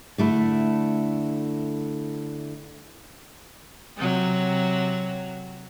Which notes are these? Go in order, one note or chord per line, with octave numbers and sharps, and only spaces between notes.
D3 A3 E4
C3 F#3